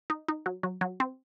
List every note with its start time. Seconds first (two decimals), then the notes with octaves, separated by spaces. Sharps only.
0.10 D#4
0.28 D#4
0.46 F#3
0.63 F#3
0.81 F#3
1.00 C4